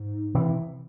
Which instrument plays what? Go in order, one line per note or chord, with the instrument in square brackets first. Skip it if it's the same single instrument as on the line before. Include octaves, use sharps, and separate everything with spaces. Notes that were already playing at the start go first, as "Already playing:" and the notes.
Already playing: [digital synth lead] G#2
[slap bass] C3 E3